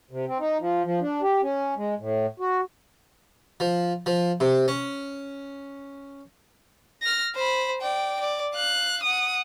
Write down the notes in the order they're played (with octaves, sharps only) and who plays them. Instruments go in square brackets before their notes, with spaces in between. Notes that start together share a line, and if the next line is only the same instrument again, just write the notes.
[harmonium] C3
C4
D#4
F3
F3
D4
G4
C#4
G#3
A2
F#4
[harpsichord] F3
F3
C3
C#4
[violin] F6 A#6
C5 B5
D5 G5
D5
F5 F#6
F#5 D#6